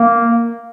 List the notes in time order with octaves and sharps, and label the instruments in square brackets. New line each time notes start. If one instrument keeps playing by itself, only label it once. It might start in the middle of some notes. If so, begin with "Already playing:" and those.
Already playing: [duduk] A#3